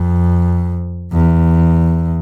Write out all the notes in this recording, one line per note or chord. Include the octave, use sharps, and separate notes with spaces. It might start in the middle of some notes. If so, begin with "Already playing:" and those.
Already playing: F2
E2